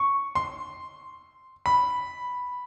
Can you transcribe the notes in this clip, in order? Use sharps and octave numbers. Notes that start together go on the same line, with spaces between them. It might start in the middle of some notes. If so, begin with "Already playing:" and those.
Already playing: C#6
C6
B5